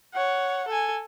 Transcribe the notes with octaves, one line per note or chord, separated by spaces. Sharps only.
C#5 F#5
A4 G#5